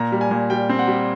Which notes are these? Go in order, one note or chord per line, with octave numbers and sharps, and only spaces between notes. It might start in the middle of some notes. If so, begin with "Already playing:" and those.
Already playing: A#2 A#5
G3
G#5
A#2
G3 G5
C4
F#5
G3